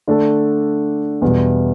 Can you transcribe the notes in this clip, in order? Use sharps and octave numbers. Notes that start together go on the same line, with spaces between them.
D3 A3 D4 A4
E2 B2 G3